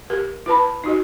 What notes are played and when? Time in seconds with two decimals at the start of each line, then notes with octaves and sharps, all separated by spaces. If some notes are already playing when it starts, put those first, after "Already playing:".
0.10 G4 A#4
0.46 E4 B4 A5 B5
0.84 D#4 F#4 D#5